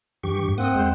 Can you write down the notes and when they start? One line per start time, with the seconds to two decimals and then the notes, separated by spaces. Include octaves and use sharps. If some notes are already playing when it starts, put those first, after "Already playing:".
0.24 G2 E3 G4 C#6
0.44 G#2
0.58 A#3 C4 F#5 D#6
0.75 E2 G#3 C5